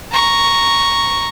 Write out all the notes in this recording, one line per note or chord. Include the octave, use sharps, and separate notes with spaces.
A#5 C#6